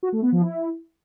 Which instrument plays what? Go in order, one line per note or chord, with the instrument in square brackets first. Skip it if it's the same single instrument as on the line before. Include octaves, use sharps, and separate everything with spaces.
[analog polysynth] F#4
A3
B3
F3
E4